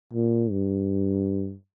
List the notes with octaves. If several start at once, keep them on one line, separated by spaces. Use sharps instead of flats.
A#2
G2